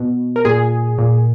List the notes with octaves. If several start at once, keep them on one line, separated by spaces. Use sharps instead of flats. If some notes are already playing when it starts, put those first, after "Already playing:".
Already playing: B2
A#4
A#2 G#4
A#2